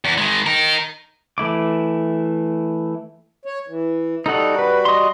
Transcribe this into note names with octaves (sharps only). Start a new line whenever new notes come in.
E2
D#3 G#3
D#4 A#4
E3 A3 E4 D6
C#5
E3
G3 D#4 F#4 A4 F#5
B4
D#5 C6